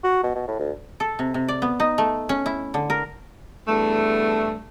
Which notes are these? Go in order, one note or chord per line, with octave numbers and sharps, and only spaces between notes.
F#4
B2
B2
A2
D2
A4
C3
C3
D5
B3
D#4
A3
C#4
E4
D3
A#4
E2 G2 A3